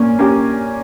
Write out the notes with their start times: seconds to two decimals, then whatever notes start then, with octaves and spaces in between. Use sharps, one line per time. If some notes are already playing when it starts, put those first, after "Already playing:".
Already playing: A#2 A#3 C#4
0.19 A#3 C#4 G4